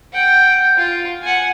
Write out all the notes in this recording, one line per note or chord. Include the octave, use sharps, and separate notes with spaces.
F#5 G5
F4
F#5 G#5